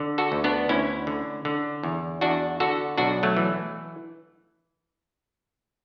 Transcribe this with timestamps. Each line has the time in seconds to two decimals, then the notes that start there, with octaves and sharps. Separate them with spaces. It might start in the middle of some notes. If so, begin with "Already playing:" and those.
Already playing: D3
0.18 F#4 A4
0.32 D2
0.44 B3 D4
0.69 D2 C#4 E4
1.07 D3
1.45 D3
1.83 E2
2.21 E2 D4 F#4
2.60 D3 F#4 A4
2.98 B1 D4 F#4
3.23 F#3 A3
3.37 E3